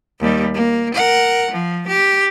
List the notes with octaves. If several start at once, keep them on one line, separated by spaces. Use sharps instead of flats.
D#2 G3
A#3
A#4 F#5
F3
G4